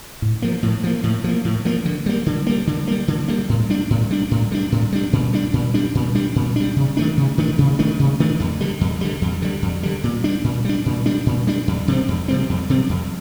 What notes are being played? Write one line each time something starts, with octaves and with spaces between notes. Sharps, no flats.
A2
F3 A#3
A2
F3 A#3
A2
F3 A#3
A2
F3 A#3
D3
G3 A#3
D3
G3 A#3
D3
G3 A#3
D3
G3 A#3
A2
G3 D4
A2
G3 D4
A2
G3 D4
A2
G3 D4
A#2
G3 D4
A#2
G3 D4
A#2
G3 D4
A#2
G3 D4
C3
D#3 A3 D4
C3
D#3 A3 D4
C3
D#3 A3 D4
C3
D#3 A3 D4
F2
D3 G3
F2
D3 G3
F2
D3 G3
F2
D3 G3
A#2
G3 D4
A#2
G3 D4
A#2
G3 D4
A#2
G3 D4
F2
C3 G3 C4
F2
C3 G3 C4
F2
C3 G3 C4
F2